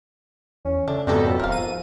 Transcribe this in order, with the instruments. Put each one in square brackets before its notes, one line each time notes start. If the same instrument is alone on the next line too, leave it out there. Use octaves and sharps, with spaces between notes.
[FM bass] E2 [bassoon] C#4
[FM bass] C#3 [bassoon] A3 [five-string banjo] D4
[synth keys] F2 B2 A4 [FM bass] G#2 [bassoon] G3 [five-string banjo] A#3 G4 A#5
[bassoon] F#2
[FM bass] D#1 [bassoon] G#2 [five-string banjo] A#4 F5
[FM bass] F3 [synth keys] D#7